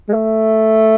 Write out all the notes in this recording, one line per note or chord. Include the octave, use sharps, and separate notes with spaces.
G#3
A3